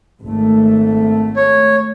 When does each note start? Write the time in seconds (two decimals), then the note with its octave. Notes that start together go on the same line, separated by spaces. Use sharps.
0.24 G#1 A3
1.36 C#5